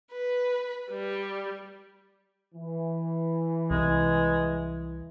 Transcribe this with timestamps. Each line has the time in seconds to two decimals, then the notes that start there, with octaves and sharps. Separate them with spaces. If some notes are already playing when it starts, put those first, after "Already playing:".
0.12 B4
0.91 G3
2.55 E3
3.70 C2 G#3